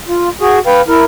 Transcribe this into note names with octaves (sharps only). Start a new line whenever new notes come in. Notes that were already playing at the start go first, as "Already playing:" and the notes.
F4
F#4 G#4
B4 F5 G5
E4 A#4